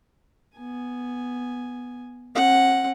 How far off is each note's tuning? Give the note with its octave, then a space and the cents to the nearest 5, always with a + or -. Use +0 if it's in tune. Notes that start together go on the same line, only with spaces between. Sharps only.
B3 +0 G#5 +0
C4 +45 F#5 +0